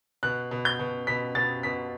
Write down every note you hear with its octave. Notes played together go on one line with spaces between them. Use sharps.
B2 F#6
B2
G6
B2
B2 B6
B2 A6
B2 B6